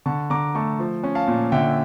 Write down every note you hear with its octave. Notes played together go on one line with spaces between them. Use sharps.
D3 A5 C#6
D3 A#5 D6
A3 A5 C#6
F3
C#4
F5 A5
A#2
D3 E5 G5